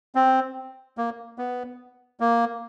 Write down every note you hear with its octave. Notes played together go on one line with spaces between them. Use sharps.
C4
A#3
B3
A#3